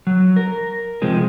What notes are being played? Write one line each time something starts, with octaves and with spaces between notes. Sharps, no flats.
F#3
A#4
C3 F3 G#3 C4